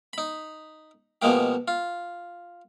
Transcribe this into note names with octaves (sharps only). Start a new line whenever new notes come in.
D#4 B5
B2 F3 G#3 A#3 G4
F4